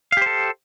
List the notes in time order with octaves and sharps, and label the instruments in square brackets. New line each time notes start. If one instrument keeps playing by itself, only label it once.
[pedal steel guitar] F5
G4
C5
A4